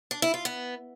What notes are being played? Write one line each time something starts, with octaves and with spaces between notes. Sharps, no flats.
D4
E4
F4
B3